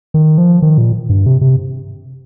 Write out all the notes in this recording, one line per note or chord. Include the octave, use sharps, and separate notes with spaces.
D#3
F3
D#3
A#2
G2
C3
C3